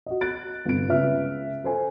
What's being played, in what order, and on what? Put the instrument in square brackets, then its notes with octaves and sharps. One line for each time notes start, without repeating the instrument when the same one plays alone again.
[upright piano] F#4 D#5
F#6 A6 D7
G1 C3 D7
C#2 C#3 B4 E5 F6
A4 C5 G#5